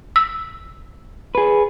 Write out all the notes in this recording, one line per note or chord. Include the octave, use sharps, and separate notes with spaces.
E6
G#4 B4